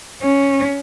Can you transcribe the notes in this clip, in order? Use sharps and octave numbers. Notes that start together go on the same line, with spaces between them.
C#4